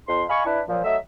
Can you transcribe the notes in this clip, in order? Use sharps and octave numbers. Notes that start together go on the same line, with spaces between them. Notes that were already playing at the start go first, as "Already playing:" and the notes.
F2 C6
D#5 F5 G#5 B5 C#6
D4 E4 B4
A#2 F3 F#3
F#3 A3 D#5 E5